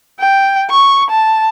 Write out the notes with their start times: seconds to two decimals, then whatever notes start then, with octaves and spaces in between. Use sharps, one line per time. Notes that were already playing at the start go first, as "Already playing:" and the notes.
0.20 G5
0.70 C#6
1.10 A5